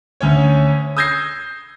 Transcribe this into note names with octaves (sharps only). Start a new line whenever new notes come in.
D2 C#4 C#5
D#6 E6 G6 G#6 A#6 C7